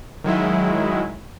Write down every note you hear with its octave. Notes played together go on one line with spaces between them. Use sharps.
D#3 F#3 G#3 E4